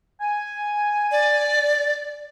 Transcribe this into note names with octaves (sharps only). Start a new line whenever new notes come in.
G#5
D5